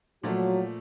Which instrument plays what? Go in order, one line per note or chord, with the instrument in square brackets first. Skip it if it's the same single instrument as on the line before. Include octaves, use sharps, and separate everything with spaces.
[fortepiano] A#2 F3 A3 [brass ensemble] F#3